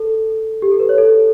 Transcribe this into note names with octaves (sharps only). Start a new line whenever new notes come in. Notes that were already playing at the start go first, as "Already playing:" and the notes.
Already playing: A4
G4
A4
B4
C#5
A4